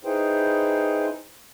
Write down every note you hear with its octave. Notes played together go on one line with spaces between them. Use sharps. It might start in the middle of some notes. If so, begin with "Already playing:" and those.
D#4 E4 G#4 B4 C5 G5